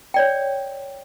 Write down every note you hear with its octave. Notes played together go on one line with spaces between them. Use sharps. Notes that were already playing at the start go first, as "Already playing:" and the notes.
C#5 D5 G5